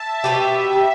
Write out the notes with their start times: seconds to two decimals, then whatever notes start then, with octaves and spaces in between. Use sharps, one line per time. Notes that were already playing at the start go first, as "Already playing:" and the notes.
Already playing: E5 A5
0.24 B2 B3 G4 E5